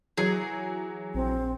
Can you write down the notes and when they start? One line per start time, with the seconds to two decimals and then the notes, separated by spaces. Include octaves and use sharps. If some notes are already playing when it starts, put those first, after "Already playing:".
0.17 E3 F#3 G#4
1.14 A#1 C4